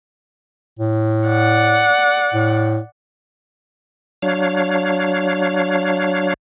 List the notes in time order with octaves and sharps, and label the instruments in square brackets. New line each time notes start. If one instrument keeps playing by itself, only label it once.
[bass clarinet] A2
[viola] D5 F#5
[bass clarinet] A2
[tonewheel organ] F#3 D4 C#5 F5